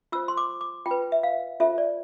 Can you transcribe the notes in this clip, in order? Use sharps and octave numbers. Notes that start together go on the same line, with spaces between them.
F4 C5 E6
C6
D6
D6
F4 G5
B4
E5
F5
F4 A4 C5 E5
D5